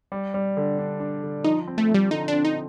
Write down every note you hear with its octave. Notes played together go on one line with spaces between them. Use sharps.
G3
G3
D3
D4
D4
D3
F3 D#4
C4
A3
F3
G3
D3 D#4
C4 D4
D#4